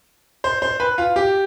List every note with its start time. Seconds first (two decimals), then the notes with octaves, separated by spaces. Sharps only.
0.44 C5
0.62 C5
0.80 B4
0.98 F4
1.16 G4